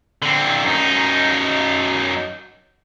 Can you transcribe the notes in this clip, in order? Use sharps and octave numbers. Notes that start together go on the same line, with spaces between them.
D3 C4
F#2 D#4